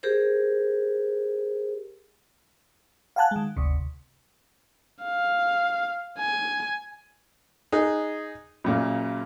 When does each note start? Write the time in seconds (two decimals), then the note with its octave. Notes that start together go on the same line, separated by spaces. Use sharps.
0.03 G4 G#4 A#4 C5
3.16 F5 F#5 G#5 A5 F#6
3.31 D#3 G#3
3.57 G1 D2 C3
5.03 F5
6.20 G#5
7.72 D#4 G#4 F#6
8.64 F#2 A#2 C#3